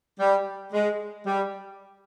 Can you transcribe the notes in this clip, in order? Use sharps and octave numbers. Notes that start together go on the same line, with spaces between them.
G3
G#3
G3